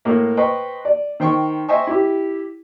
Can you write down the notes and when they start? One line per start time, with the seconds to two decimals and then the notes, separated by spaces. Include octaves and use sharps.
0.05 A2 A#3
0.37 B4 C5 D#5 G5 C#6
0.85 D5
1.20 D#3 C5 G5 C#6
1.68 C5 D#5 E5 G5 G#5 C#6
1.87 E4 G4